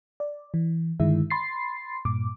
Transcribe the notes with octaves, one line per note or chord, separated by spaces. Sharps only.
D5
E3
G2 D3 D#3 G#3 E4 E5
B5 C6 A6 C7
G2 A#2 D6